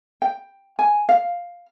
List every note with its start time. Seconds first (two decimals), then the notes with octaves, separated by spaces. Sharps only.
0.22 G5
0.79 G#5
1.09 F5